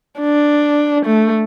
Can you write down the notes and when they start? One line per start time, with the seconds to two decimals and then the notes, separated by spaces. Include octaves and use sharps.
0.19 D4
1.06 A3